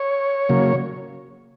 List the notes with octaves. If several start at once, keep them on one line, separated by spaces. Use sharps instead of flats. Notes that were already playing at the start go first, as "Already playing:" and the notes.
Already playing: C#5
C#3 F#3 A#3